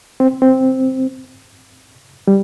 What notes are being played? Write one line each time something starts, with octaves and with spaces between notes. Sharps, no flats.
C4
C4
G3